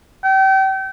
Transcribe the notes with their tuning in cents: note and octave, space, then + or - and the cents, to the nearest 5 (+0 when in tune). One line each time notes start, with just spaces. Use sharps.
G5 -35